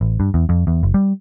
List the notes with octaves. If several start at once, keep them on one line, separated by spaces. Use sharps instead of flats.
A1
G2
E2
F2
E2
F#1
G3